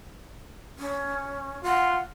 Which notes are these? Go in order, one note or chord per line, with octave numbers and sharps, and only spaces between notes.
C#4
F4 F#5